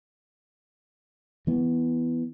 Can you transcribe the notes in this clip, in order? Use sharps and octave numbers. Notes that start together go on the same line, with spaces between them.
E3 B3